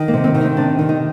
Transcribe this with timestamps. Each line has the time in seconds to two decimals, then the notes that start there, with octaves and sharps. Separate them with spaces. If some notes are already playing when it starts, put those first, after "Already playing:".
Already playing: D#3
0.08 A#3
0.14 C3
0.24 C4
0.34 D#3
0.41 D#4
0.57 C3 D4
0.79 D#3
0.89 D#4